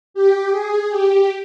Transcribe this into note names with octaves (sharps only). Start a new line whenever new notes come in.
G4
G#4
G4